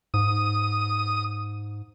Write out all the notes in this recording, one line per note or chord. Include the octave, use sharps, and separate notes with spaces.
G#2 D#6